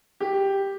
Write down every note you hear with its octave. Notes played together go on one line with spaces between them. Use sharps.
G4